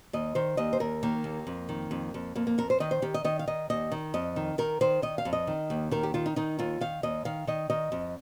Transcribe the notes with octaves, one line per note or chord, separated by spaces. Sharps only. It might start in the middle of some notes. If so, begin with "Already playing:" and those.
D#2 D#5
D#3 C5
D#2 D#5
C5
D#2 A#4
D#3 A#3
D#2
F2
D#3
F2
F2
F2 A#3
A#3
F2 A#4
C5
D#3 D#5
C5
D#3 G4
D#5
D#3 D#5
F5
D#3 D#5
D#2 D#5
D#3
F2 D#5
D#3
D#3 A#4
D#3 C5
D#3 D#5
F5
F2
D#5
D#3
D#2
D#3 A#4
G4
D#3 F4
D#4
D#3 D#4
D#2 F4
D#3 F5
D#2 D#5
D#3 F5
D#3 D#5
D#3 D#5
F2